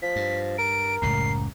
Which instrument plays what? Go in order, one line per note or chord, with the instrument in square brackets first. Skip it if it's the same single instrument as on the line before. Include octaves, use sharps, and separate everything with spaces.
[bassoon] F3 [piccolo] B6
[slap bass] G2
[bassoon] A#4 [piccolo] D7
[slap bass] F#1 C#2 F#2 [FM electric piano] A2 C#3 A#5 [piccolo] C7